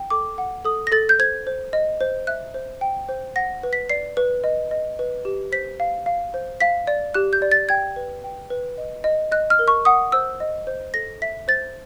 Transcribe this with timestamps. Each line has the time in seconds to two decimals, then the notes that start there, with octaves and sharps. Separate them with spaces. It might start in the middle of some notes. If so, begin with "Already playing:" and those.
Already playing: G5
0.10 A4 D6
0.38 F#5
0.65 A4 D#6
0.87 A#6
0.92 A4 A6
1.09 G6
1.19 C5 G#6
1.47 C5
1.73 D#5
2.01 C5
2.27 E5 F#6
2.54 C5
2.81 G5
3.09 C5
3.36 F#5 A#6
3.63 B4
3.73 B6
3.89 D5 C7
4.17 B4
4.44 D#5
4.71 D#5
4.99 B4
5.25 G4
5.52 C5 B6
5.80 F5
6.06 F5
6.34 C5
6.60 F5 B6
6.87 D5
7.14 G4 F#6
7.33 G6
7.42 D5
7.52 A6
7.69 G5 G#6
7.96 B4
8.24 G5
8.50 B4
8.78 D#5
9.04 D#5
9.32 D#5 F#6
9.50 F6
9.59 A#4
9.68 C#6
9.85 F#5 D#6
10.12 C5 E6
10.40 D#5
10.67 C5
10.94 A4 A#6
11.22 E5 B6
11.48 C5 A6